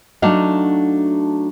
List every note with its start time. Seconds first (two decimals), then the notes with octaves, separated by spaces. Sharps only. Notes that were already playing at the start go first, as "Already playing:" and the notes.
0.22 F#3 A3 D4 D#4 F#4 F5